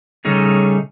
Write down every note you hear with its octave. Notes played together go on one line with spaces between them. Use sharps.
C#3 G3 A3 C#4 D#4 G#4